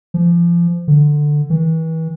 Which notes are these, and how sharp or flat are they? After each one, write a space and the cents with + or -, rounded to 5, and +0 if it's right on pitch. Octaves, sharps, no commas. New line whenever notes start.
F3 -30
D3 +10
E3 -35